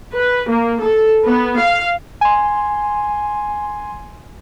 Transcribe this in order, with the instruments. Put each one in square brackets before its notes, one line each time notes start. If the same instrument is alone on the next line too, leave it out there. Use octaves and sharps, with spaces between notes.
[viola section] B4
A#3
A4
B3
F5
[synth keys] G#5 C6